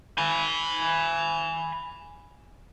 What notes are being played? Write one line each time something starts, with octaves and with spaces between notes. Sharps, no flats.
G#5 B5